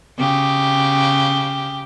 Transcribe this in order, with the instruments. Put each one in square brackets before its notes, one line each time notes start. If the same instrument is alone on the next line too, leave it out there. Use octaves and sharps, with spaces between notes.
[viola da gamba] C#3 G4